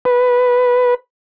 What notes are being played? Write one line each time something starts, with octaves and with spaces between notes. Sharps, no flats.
B4